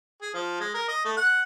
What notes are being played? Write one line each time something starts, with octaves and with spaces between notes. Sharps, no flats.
G#4
F3
G#3
A#4
D#5
A3
F#5